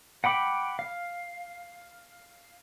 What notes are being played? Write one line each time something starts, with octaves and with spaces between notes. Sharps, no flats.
F#5 G5 B5 D6
F5